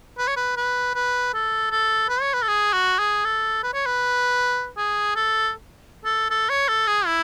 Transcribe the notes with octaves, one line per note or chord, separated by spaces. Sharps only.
B4
C#5
B4
B4
B4
A4
A4
B4
C#5
B4
A4
G#4
F#4
G#4
A4
B4
C#5
B4
G#4
A4
A4
A4
C#5
A4
G#4
E4